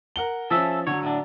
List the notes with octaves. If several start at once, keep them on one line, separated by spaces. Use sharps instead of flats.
A#4 F#5 G7
F3 C#4 G#4 A4 E5
D3 F#3 C#5
A2 D4